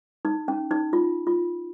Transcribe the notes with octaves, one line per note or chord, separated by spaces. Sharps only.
D#4
C#4
D#4
F4
F4